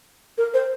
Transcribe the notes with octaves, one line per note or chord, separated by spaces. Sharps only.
A#4
C5